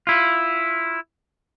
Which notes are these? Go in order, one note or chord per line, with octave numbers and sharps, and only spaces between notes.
E4 F4